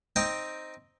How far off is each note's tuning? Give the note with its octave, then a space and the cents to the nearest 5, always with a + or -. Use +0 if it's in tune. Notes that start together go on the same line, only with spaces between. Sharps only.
C4 +0 D#4 +0 G5 +0